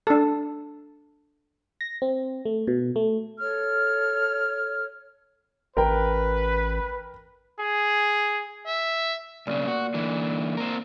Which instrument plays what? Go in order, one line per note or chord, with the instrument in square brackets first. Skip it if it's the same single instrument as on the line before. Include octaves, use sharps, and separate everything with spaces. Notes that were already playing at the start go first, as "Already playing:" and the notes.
[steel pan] D4 A4
[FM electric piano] A#6
C4
A3
B2
A3
[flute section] A4 C#5 F6
[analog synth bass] A1 [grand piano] A#4 G5 [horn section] B4
[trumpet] G#4
[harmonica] E5
[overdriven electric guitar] B1 C#3 [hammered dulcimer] A#2
[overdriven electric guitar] F#4
D3 E3
C4 A#4